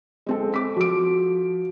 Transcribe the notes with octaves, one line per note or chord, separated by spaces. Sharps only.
G#3 C4 A4
D6 B6
F3 F#4 D7